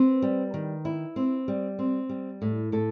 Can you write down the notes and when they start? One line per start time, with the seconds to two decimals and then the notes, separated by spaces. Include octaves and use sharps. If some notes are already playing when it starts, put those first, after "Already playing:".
Already playing: C4 B4
0.22 G3
0.54 D#3
0.85 E4
1.16 C4
1.48 G3
1.79 C4
2.09 G3
2.42 A2
2.72 A2 A4